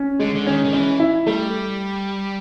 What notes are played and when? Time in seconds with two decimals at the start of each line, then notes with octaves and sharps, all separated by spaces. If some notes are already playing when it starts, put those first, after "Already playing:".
Already playing: C#4
0.19 D3 G#3
0.35 D3
0.47 D#3 C#4
0.64 D#3
0.73 E3 C#4
0.99 E4
1.26 G3 A3